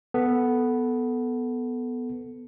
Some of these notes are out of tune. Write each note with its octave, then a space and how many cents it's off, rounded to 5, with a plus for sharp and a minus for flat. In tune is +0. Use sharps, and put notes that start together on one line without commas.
B3 +0 A4 +0